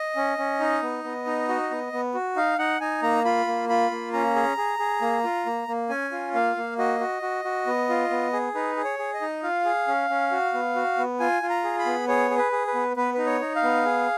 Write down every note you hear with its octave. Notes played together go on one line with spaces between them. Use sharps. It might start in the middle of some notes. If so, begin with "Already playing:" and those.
Already playing: D#5
C#4
C#4
D#4
B3
B3
D#4
F#4
B3
B3
F#4
D#4 F5
D#4 F#5
D#4 G#5
A#3 A#5
F4 B5
A#3
F4 B5
A#3
C#4 A#5
G#4
G#4
G#4
A#3
F4
A#3
A#3
C#4 G#5
F4
A#3 F5
A#3
F#4 D#5
F#4
F#4
F#4
B3
F4
B3
G#4
D#4 B4
G#4
C#5
G#4
D#5
D#4
F4 F5
G#4
C#4
C#4
F#4
B3
F#4
B3
F4 G#5
F4
A#5
G#4
B5
B3
G#4 C#5
G#4
B4
G#4
B4
B3
B3 B4
D#4 B4
C#5
D#4
F5
B3
G#4